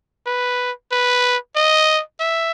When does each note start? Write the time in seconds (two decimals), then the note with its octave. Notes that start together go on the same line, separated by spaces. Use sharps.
0.26 B4
0.92 B4
1.56 D#5
2.20 E5